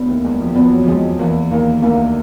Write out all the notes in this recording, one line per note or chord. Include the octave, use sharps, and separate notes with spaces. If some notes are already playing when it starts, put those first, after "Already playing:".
Already playing: D2 D3 B3
D#2 D#3
E2 E3 G#3
F2 F3
F3 B3
F#3
F2 F3 G#3
E2 E3 A#3
D#2 D#3 A#3
D2 D3 A#3